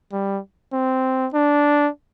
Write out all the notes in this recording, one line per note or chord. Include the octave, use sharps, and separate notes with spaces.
G3
C4
D4